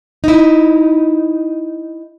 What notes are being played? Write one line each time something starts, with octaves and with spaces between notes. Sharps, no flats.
D#4 E4